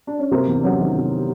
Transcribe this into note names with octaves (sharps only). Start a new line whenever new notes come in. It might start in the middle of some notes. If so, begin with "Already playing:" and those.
D4
C#4
C3 A#3 C4
E2
D4
F#3 B3 C#4
D#3
C3